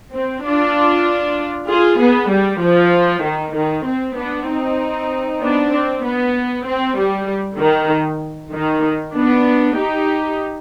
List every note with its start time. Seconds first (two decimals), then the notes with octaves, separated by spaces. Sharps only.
0.13 C4
0.43 D4 F4
1.69 F4 G#4
2.00 B3
2.30 G3
2.61 F3
3.23 D#3
3.55 D#3
3.86 C4
4.16 B3 D4
4.48 C4 D#4
5.41 B3 D4
5.72 C4
6.04 B3
6.66 C4
6.97 G3
7.58 D#3
8.52 D#3
9.14 B3 D4
9.76 D#4 G4